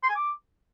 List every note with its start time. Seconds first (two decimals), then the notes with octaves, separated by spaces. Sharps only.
0.03 C6
0.09 G#5
0.15 D6